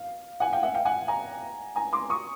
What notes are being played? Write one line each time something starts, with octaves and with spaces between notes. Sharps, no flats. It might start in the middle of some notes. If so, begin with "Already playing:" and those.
Already playing: F5
F#5 G#5
F5 G5
E5 F#5
F5 G5
F#5 G#5
G#5 A#5
G#5 A#5
C6 D6
C#6 D#6